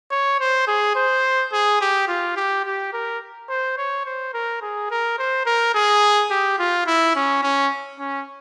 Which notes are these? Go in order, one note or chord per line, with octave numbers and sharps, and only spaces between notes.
C#5
C5
G#4
C5
G#4
G4
F4
G4
G4
A#4
C5
C#5
C5
A#4
G#4
A#4
C5
A#4
G#4
G4
F4
E4
C#4
C#4
C#4